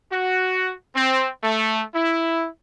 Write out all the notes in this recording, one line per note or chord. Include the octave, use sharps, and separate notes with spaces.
F#4
C4
A3
E4